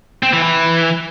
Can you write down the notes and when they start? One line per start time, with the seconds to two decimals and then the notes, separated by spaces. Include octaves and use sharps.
0.23 C4
0.33 E3
0.43 E3